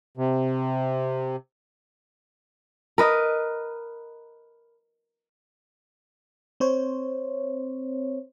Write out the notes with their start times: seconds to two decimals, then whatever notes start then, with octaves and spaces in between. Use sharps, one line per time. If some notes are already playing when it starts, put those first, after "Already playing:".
0.17 C3
2.98 A#4 B4 D#5
6.60 C4 C5 C#5